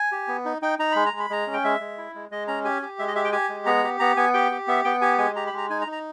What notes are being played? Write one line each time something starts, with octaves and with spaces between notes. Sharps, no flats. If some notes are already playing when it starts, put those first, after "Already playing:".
Already playing: G#5
G4
B3
D#4
D#4 G5
D#4 A#5
G#3 B5
A#5
G#3
B5
G#3 A#5
C#4
G5
G#3 E5
G#3
E4
G#3
G#3 D#5
C#4 A#5
G4 G#5
G4
G#3 E5
D#5
G4 E5
G5
G4 G#5
G#3
B3 A#5
G4
B3 A#5
B3 G#5
G4 G5
G4
B3 E5
B3 G5
G4 G#5
G#3 G#5
G4 A#5
B5
G#3 A#5
D#4 G#5
A#5
D#4
A#5